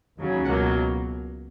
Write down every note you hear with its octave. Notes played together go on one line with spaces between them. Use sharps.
D#2 C#3 F#3
C#2 B2 F#3 A#3 F#5